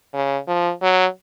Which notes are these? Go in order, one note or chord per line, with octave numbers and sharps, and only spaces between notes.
C#3
F3
F#3